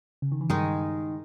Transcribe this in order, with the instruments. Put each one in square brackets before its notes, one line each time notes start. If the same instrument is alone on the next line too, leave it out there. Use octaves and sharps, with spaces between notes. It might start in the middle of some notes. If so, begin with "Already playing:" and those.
[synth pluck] C#3
D#3
E3
[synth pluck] G2 G3 [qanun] D#3 G#3 D#4 G#4